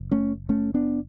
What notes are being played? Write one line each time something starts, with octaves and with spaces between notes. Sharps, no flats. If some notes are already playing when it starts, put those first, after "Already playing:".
Already playing: F#1
A3 C#4
A3 C#4
B3 D4